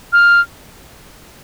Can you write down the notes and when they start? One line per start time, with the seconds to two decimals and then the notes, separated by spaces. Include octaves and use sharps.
0.13 F6